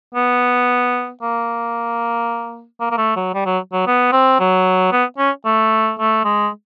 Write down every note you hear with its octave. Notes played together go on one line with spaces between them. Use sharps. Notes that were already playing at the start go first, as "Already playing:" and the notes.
B3
A#3
A#3
A#3
A3
F#3
G3
F#3
F#3
B3
C4
F#3
B3
C#4
A3
A3
G#3